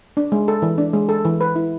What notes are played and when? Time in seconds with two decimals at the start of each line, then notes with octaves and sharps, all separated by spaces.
0.17 D4
0.32 G#3
0.48 A4
0.62 E3
0.78 D4
0.94 G#3
1.09 A4
1.25 E3
1.41 B4
1.56 E4